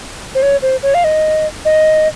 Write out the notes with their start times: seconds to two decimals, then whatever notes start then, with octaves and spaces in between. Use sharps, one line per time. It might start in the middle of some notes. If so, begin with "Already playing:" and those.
0.35 C5
0.42 C#5
0.62 C5
0.83 C#5
0.94 F5
1.04 D#5
1.65 D#5